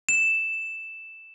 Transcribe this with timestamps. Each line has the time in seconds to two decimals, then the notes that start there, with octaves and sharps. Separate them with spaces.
0.09 E7